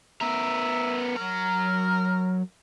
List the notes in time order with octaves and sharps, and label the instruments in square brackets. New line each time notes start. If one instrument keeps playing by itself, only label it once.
[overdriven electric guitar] B3 A#4 [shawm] E5
[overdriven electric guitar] F#3 A#5 [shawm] A#4